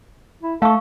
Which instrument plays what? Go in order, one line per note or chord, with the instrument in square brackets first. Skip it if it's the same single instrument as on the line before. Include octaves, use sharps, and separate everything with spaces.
[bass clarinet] E4
[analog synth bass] A3 [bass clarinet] A4 [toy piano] F5 C#6